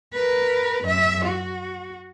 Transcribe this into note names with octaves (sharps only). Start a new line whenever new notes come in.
A#4 B4
F#2 E5
F#4